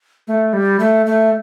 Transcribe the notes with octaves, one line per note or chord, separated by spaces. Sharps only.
A3
G3
A3
A3